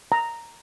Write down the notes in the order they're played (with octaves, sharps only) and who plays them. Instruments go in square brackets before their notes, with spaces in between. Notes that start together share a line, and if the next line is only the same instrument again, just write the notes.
[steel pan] A#5